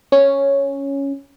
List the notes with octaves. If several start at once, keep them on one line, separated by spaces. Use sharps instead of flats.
C#4